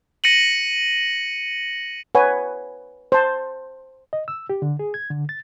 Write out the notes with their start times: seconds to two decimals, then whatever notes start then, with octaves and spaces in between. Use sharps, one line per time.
0.24 A#6 C#7 D#7 F#7
2.15 B4 C#5 F#5 G#5
3.12 C5 A5
4.13 D#5
4.28 E6
4.50 G4
4.62 D3
4.79 G#4
4.94 G#6
5.10 D3
5.29 A6